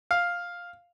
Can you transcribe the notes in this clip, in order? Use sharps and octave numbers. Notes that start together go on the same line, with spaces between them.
F5